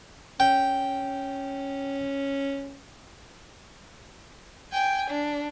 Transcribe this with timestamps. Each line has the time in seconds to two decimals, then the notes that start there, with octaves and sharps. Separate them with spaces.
0.40 C#4 G5
4.72 G5 G#5
5.10 D4